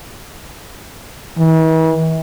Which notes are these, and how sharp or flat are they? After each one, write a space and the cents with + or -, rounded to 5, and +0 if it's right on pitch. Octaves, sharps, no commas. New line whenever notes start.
E3 -40